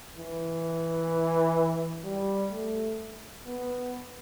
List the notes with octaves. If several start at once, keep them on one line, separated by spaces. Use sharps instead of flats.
E3
G3
A3
B3